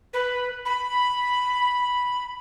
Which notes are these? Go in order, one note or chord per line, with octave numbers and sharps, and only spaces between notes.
B4
B5